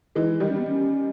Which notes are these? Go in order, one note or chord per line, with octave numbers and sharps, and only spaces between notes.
E3 G#3 D#4
D#3 G3 D#4
C#4
B3
C#4